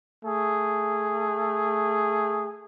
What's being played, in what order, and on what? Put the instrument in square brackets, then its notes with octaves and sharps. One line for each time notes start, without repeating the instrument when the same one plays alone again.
[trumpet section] A3 G#4